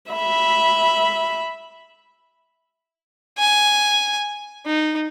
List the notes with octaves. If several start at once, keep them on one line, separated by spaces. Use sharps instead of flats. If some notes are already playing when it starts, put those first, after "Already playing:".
E5 B5
G#5
D#4